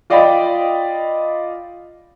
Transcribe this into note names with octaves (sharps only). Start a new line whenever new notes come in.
F4 D5 D#5 F5 G5 B5